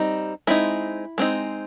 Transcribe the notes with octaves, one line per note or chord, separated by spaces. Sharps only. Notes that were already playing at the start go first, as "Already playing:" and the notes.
Already playing: G3 C4 D#4
G#3 C4 D#4 E4
G#3 C4 D#4